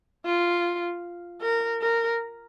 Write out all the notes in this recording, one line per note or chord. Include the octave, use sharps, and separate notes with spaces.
F4
A#4
A#4